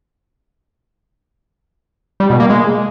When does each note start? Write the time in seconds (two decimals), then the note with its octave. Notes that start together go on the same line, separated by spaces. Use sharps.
2.20 G3
2.30 B2
2.40 A#3
2.50 G#3